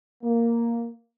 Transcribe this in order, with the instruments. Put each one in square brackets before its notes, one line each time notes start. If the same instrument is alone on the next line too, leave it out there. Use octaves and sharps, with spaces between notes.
[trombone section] A#3